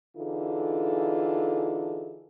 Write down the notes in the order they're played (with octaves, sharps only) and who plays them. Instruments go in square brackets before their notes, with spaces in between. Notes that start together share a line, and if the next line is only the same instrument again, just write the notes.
[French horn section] D3 E3 D#4 F4 G#4 A4